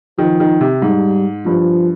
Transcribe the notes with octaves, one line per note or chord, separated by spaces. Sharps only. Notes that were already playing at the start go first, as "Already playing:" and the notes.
D#3 F3
D#3
C3
G#2 G3
G2 F3